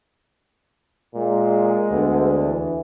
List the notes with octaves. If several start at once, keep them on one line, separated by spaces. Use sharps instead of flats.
A#2 G#3
D2 B3
E3